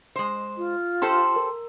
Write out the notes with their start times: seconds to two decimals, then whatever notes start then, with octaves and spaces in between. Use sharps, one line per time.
0.16 G#3 C5
0.57 F4
1.02 G4 A4 C5 C6
1.36 A#4